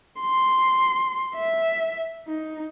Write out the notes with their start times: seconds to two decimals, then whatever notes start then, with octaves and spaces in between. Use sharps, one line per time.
0.20 C6
1.36 E5
2.28 D#4